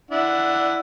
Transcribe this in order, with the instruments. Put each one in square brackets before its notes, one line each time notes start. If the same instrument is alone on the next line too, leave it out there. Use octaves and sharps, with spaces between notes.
[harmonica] D4 E4 F#5